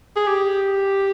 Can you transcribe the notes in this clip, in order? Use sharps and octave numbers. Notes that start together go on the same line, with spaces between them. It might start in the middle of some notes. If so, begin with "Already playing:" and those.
G#4
G4